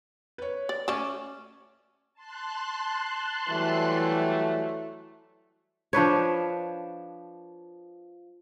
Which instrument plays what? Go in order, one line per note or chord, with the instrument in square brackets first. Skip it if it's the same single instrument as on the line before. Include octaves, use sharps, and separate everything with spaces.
[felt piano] B4 C#5
[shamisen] D5
[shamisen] A3 D5 A5 [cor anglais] C#4 [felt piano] D6
[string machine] A5 C6 F#6
[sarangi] E3 [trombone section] F#3 G3 A3
[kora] F3 D4 B4 C#5